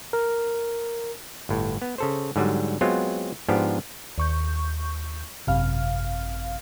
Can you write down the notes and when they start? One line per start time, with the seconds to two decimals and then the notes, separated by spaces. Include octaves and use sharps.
0.13 A#4
1.49 G1 A2
1.82 B3
1.98 C#3 A4 C5
2.36 G#2 D3 F#3 G3
2.81 F#3 G#3 B3 C4 F4
3.48 G#2 F3 B3 D4 G4
4.18 D#2 C#6 G6
5.47 G#1 F#2 C3 F5 F6